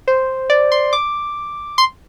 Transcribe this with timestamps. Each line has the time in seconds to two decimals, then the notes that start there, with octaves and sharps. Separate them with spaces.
0.08 C5
0.50 D5
0.72 C6
0.93 D6
1.78 C6